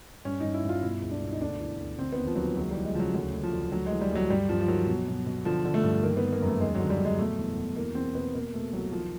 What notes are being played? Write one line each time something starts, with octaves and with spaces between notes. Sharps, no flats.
G2 C#4
G2 D#4
E4
G2 F4
B2 E4
C#2
D4
B2
D#4
D2 D4
E3
D2
D3 C4
B3
D#2
F3
D#2 F#3
F3
C#2 F#3
E3 G3
G#3
C#3 F3
F#3
D2 F#3
D2
F3
D2
D2 F#3
G#3
E3
G3
D2 F#3
G2 G3
G2 F3
F3
D#3 F#3
B2
B2
B2
D3 F3
D3
A3
G2
D#3 A#3
B3
D#3
A#3
F#2 A3
D#2 G#3
D3 F#3
G3
D3
G#3
B2 A3
E2
B2
E2 A#3
E2 C4
B2 B3
B2 A#3
B2 A3
C2 F#3
D#3 F3